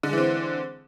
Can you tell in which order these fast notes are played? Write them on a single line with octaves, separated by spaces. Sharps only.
D3 G#3 E3 C4